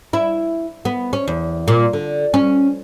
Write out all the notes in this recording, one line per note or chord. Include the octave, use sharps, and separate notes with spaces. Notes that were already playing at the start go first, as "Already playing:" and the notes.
E4
B3
C#4
E2
A#2
D3
C#4